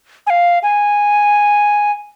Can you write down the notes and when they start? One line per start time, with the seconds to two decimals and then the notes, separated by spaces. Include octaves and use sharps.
0.27 G#5
0.30 F5
0.63 G#5